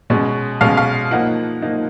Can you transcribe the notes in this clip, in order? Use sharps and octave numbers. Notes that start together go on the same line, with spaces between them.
B2 G#3 C#4
B2 G#3 C#4 F5
F5
F3 A#3 D#4 F#5
F3 A#3 D#4